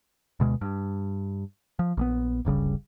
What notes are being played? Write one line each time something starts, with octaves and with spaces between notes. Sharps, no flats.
D2 B2 G#3
G2
F3
A#1 G3 B3
D1 G1 C#3 G3